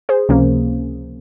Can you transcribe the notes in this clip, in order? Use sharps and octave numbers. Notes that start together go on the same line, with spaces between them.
G#4 C5
C#2 C3 F3 A#3 C#4